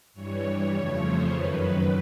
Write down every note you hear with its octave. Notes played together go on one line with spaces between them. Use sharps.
G2 E3 G3 C#5
F2 C#3 F3 A3 C#5
C5
F#2 D#3 F#3 B4